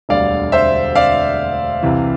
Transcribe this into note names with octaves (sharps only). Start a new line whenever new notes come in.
E1 D2 D3 G3 D5 F5
C5 E5
D5 F5
C2 C3 E3